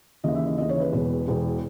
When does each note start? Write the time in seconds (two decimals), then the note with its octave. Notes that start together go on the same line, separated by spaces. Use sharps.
0.24 D#2 C#3 E3 D#5
0.35 E5
0.47 D#5
0.58 D#2 C#3 E3 D#5
0.69 C#5
0.81 B4
0.92 E1 E2 B2
1.27 E1 E2 B2